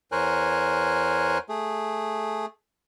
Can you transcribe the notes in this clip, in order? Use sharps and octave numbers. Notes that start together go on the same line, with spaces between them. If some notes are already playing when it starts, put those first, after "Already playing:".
E2 A#4 C5 C#5 G#5 F#6
A3 G#4